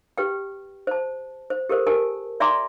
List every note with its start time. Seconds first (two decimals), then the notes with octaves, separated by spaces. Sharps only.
0.18 G4 B4 G5
0.87 C5 A5
1.50 C5
1.69 G4 A4 A#4 C5
1.87 G4 A#4 G#5 A5
2.40 D5 E5 G#5 A#5 C6 D6